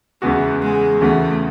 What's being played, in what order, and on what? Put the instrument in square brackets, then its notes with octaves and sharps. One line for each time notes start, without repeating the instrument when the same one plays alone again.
[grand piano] E2 C#3 E3 B3 F#4 [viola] G#3
[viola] G#3
[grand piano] E2 C#3 E3 B3 F#4 [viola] A3